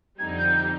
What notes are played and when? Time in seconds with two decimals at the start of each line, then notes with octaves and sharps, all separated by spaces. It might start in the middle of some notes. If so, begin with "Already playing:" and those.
0.19 F2 D3 G3 C4 D#4 G#6
0.38 G6